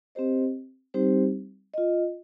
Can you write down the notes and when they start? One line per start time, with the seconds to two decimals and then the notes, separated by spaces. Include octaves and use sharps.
0.15 C4 G4 C5 D#5
0.94 G3 C4 D#4 G4 C5
1.74 F4 D#5